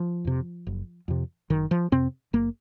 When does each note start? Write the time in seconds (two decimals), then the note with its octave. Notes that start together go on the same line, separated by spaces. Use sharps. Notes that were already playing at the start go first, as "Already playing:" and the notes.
Already playing: F3
0.25 F2 C3
0.67 F#1
1.08 F2 C3
1.50 F#1 D#3
1.71 F3
1.92 F2 C3 C4
2.33 F#1 A#3